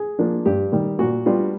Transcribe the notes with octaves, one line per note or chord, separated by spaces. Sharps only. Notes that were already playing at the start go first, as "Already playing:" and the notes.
Already playing: G#4
F3 A#3 D4
G2 G4
D#3 G3
A#2 F#4
G3 B3 D4 F4